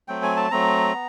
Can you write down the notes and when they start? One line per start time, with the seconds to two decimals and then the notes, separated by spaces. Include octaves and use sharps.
0.08 F#3 A3 C4 G5
0.23 G#5
0.36 A5
0.51 F#3 A3 C4 A#5
0.94 B3